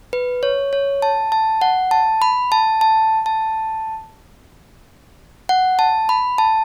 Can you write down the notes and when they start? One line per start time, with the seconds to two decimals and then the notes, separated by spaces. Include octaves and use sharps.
0.13 B4
0.43 C#5
0.73 C#5
1.02 A5
1.32 A5
1.62 F#5
1.91 A5
2.22 B5
2.52 A5
2.81 A5
3.26 A5
5.49 F#5
5.79 A5
6.09 B5
6.38 A5